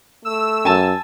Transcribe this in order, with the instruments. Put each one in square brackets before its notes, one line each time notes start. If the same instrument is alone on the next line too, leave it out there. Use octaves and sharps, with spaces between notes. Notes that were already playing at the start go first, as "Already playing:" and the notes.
[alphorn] A3 [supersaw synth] E6
[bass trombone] F#2 [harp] G#5 A5